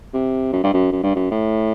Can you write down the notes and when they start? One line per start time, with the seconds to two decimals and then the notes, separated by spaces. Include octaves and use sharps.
0.14 C3
0.53 F#2
0.64 G2
0.74 F#2
0.92 F#2
1.04 G2
1.16 F#2
1.31 A2